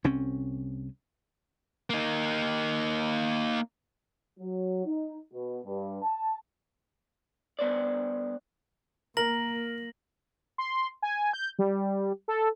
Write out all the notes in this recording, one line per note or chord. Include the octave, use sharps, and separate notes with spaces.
C2 C4 C#4
A#3 D#4
F#3
D#4
B2
G2
A5
G2 B3 C5 D5
A#3 A#4 A#6 F#7
C6
G#5
G6
G3
A4